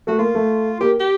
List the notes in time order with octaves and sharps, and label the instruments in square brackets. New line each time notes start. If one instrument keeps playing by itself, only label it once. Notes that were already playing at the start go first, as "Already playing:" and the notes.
[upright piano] A3 [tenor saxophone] F#4
[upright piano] A#3 [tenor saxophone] F4
[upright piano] A3
[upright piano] A#3 [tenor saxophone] G4
[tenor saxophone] G4